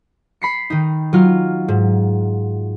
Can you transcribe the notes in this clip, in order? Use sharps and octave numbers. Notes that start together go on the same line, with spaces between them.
B5 C7 C#7
D#3 D#4
F#3 F4 F6
G#2